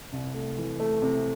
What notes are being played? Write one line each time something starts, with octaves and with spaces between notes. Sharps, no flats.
C2
A3
E3
A3
C3